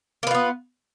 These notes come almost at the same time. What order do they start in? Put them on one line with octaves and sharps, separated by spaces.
A#3 B4 F4 B3